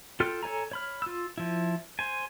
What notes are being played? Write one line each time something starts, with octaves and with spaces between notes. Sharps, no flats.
F4 A4 G5 F6
A4 C#5 G#5 A#5
C#5 B5 F6
F4 E6
F3 E4
C5 G#5